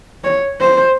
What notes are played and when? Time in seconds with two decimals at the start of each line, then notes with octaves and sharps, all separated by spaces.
0.24 C#5
0.61 C5